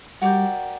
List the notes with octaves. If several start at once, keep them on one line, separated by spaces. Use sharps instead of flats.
G3 F#4 A#4 D5 G5